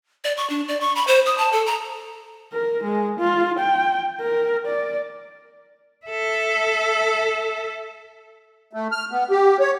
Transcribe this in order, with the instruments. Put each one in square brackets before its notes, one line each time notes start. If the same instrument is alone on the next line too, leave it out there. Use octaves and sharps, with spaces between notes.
[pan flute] D5
C#6
D4
D5
C#6
B5
C5
D#6
A5
A4
A#5
[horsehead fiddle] A#4
G#3
F4
G5
A#4
D5
[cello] A4 E5
[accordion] A3
F6
B3
G4
C#5